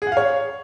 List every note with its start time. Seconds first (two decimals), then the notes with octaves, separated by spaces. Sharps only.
0.02 G#4
0.07 F#5
0.12 F5
0.17 C#5